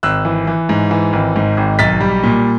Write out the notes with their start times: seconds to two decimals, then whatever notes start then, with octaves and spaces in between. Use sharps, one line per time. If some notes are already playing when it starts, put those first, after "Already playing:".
0.03 G#1 E6 F#6
0.25 E3
0.47 E3
0.69 G#2
0.91 E3
1.13 G#1
1.36 G#2
1.57 G#1
1.79 B1 A6 B6
2.01 G3
2.23 A#2